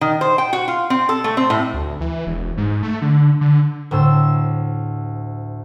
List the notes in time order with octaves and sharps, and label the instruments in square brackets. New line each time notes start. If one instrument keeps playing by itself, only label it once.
[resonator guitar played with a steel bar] D#3
C5
G5
F#4
F4
C4
A4
A3
C4
A2
[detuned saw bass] D2
E3
E1
G#2
A3
D3
D3
[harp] D2 A2 C5 E6